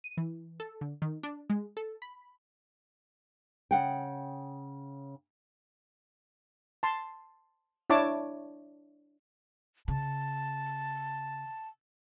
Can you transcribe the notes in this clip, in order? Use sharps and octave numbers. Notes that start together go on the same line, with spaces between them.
D#7
E3
A4
D3
D#3
D4
G#3
A4
B5
C#3 F#5 G5
A5 C6
D4 E4 C#5 A5 D6
C#3 A5